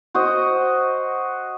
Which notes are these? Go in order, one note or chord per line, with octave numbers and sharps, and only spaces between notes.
F#4 C5 D#5